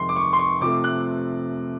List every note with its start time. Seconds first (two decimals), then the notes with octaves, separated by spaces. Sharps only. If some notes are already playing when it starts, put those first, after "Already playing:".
Already playing: F2 C3 D#3 G#3 C6
0.09 D6
0.16 C#6
0.33 C6
0.39 C#6
0.61 C3 F3 A3 D6
0.84 F#6